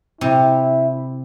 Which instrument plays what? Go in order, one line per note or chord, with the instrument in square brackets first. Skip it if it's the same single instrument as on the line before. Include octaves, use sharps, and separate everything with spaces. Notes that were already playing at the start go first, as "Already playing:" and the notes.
[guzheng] C3 [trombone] E4